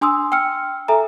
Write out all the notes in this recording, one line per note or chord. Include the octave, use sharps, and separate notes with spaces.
D4 G#5 C6 D#6 E6
G5 E6 F6 C#7
A4 E5 G#5 A#5